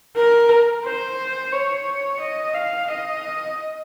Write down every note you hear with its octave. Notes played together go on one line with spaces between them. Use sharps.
A#4
C5
C#5
D#5
F5
D#5